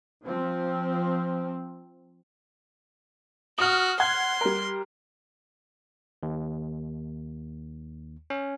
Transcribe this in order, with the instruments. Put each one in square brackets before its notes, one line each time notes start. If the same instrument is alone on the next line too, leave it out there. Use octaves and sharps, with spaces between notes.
[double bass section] F3 C4
[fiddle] F#4 [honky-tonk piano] D#6 F6
[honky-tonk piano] F#5 F#6 G#6 [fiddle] C6
[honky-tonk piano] G3 A#4
[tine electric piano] D#2
C#4